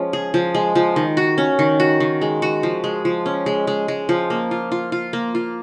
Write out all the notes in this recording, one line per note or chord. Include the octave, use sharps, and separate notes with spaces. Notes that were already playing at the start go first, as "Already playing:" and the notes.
Already playing: F3 G#3 C#4
G#4
F3
G#3
F3
D#3
F#4
C#4
D#3
F#4
D#3
G#3
F#4
F3
G#3
F3
C#4
G#3
G#3
G#3
F3
A#3
F4
F4
F4
A#3
F4